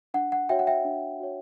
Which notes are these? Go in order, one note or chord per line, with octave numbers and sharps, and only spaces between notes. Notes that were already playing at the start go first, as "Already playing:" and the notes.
D4 F#5
F#5
F#4 C#5 E5 G5
F#5
E5 G5
D4
F#4 C#5